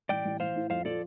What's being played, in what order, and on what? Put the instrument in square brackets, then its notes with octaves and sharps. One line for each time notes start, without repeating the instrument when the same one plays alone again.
[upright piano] A1 [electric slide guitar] D5 G5
[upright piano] A1
[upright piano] A1 [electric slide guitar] C5 F5
[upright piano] A2
[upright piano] F2 [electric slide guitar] C5 F5
[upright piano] F3 [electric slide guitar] A4 D5